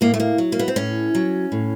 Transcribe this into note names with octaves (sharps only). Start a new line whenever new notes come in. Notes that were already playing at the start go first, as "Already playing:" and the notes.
A2 A#3
A3
A#3
F#3
A#3
B3
C4
A2 C#4
F#3
A2